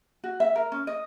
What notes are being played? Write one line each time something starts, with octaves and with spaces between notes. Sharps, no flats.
F#4
E5
A#4
C#4
D#5